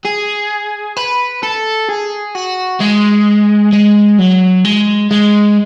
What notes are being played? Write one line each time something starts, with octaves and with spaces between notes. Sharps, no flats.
G#4
B4
A4
G#4
F#4
G#3
G#3
F#3
G#3
G#3